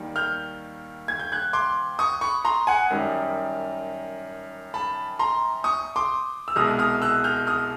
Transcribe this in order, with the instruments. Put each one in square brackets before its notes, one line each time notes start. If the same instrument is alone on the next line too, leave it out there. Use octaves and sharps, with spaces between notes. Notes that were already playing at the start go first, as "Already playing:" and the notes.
Already playing: [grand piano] D#2 D#3 G3
F6 G6
G#6
G6
F#6 G#6
C6 D6
C#6 D#6
B5 C#6
A#5 C6
F#5 G#5
F#2 D#3 G3
A5 B5
A#5 C6
C#6 D#6
C6 D6
E6
C2 B2 G#3 D#6 F6
D#6 F6
E6 F#6
F6 G6
D#6 F6